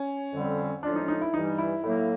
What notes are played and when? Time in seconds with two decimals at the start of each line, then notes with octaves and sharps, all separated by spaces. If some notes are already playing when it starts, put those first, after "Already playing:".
Already playing: C#4
0.32 F2 D3 G3 C4
0.83 A2 F3 G#3 C#4 D4 F4
0.95 D#4
1.08 D#4
1.22 E4
1.33 G2 E3 G3 D#4
1.58 E4
1.83 A2 F#3 A#3 E4